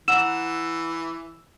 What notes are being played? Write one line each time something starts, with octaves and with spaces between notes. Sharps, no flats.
E3 F#5 A#5 E6 E7